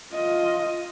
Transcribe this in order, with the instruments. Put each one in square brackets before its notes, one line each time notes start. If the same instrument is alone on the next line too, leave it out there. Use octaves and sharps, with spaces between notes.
[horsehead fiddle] F4 D#5